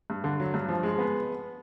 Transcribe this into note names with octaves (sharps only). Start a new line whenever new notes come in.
G2
D3
F#3
G2
F3
G#3
B3